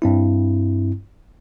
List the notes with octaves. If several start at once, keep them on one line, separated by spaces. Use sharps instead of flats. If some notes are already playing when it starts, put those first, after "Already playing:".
G2 C4 E4